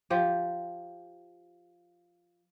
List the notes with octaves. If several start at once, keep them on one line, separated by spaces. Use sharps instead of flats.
F3 G4